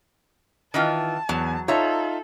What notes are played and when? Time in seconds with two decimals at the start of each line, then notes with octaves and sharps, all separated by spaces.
0.74 D#3 E3 F4 A5
1.29 E2 F#3
1.68 D#4 F4 A4 C#5 E5 A#5